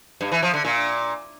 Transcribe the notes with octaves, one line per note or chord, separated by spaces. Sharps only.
G2
E3
F3
D3
A#2